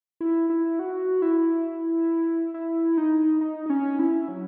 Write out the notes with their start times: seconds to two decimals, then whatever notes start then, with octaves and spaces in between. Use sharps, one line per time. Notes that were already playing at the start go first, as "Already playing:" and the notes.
0.21 E4
0.50 E4
0.79 F#4
1.22 E4
2.54 E4
2.97 D#4
3.41 D#4
3.66 D#4
3.70 C#4
3.99 E4
4.28 F#3